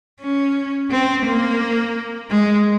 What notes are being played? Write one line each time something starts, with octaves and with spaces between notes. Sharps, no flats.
C#4
C4
A#3
G#3